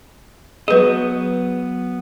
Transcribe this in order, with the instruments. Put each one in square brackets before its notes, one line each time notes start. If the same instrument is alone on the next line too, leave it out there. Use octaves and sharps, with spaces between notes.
[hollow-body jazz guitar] F#3 B3 D#5 [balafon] G#4 B4